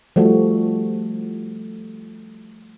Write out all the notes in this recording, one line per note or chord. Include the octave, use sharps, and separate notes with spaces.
F3 G3 A3 F#4